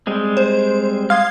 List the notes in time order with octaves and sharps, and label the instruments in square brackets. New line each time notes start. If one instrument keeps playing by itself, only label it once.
[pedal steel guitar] G3 G#3 C4
[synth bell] C5
[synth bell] F5 C6 G#6 [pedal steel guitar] D#6 F6